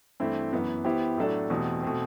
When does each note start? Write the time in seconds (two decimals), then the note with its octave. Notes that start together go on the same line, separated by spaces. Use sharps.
0.20 G2 E3 A3 C4 E4
0.53 F#2 E3 B3
0.84 E3 B3 E4 G4 C5
1.17 A2 F#3 A3 D4 A4
1.50 E2 B2 A3 C4 G4
1.82 B2 A3 C4